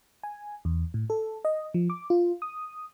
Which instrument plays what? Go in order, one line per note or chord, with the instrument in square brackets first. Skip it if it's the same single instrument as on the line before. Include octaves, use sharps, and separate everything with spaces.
[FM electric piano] G#5
E2
A2
A4
D#5
F3
D6
F4
D#6